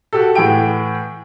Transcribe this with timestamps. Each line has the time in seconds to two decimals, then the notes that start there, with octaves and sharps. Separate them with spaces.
0.13 F#4 G4 A4
0.35 A2 E3 F#5 G5 D7